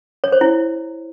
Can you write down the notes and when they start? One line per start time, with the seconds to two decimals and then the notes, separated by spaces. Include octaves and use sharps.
0.24 C#5
0.32 C5
0.41 E4